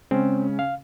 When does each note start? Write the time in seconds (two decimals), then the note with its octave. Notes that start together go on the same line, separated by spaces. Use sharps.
0.11 C#3 G#3 C4 C#4
0.59 F5